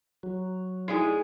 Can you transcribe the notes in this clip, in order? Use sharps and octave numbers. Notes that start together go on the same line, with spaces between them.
F#3
A2 G#3 D#4 E4 G#4 D5